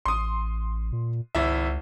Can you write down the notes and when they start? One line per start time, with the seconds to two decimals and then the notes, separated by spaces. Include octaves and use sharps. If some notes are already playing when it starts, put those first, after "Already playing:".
0.06 A1 C6 D#6
0.92 A#2
1.35 G#1 C#2 E4 E5